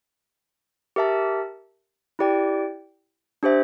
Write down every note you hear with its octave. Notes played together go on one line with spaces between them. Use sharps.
G4 A#4 E5 A5
E4 G4 D5 G5
D4 G4 C5 E5